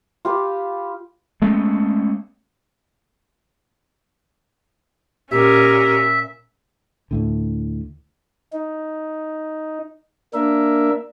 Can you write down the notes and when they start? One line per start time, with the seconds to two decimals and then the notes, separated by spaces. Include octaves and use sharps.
0.25 F4 G4 B4
1.42 G#3 A3 B3 C#4
5.31 A#2 C#4 G4 A#4 E5
7.11 D2 A2 D3
8.53 D#4
10.34 A#3 D4 A#4 E5